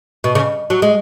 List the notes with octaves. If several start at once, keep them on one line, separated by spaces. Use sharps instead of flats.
B2
C#3
F#3
G#3